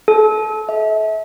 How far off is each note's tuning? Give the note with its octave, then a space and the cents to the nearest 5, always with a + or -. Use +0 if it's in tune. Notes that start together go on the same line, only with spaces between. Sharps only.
A4 -35
E5 -35